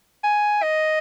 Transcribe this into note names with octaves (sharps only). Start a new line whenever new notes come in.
G#5
D#5